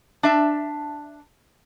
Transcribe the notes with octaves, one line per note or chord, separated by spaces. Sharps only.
D4 E5 A5